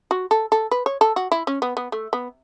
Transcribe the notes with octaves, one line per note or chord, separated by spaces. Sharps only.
F#4
A4
A4
B4
C#5
A4
F#4
E4
C#4
B3
B3
A3
B3